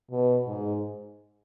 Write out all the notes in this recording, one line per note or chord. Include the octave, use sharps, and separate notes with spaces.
B2
G#2